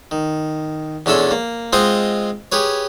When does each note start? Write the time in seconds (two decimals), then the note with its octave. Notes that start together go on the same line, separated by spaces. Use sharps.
0.11 D#3
1.06 E2 C#4 D4 A4 E5 C6
1.31 A#3
1.73 G#3 C4 F4 C5 D#5 F#5
2.52 G4 G#4 B4 C#5